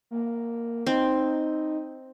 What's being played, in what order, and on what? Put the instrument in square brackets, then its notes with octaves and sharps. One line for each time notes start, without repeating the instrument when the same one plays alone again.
[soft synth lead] A#3
[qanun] C4 [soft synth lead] D#4